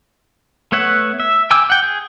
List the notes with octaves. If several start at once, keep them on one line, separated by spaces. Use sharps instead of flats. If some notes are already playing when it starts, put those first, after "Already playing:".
A3 B3 C#5 E5 F#5
E5
G5 G#5 D6 E6
F#5 G5
G#4